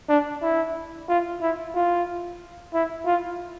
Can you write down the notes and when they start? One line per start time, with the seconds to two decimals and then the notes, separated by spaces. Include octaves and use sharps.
0.09 D4
0.42 E4
1.08 F4
1.42 E4
1.74 F4
2.74 E4
3.06 F4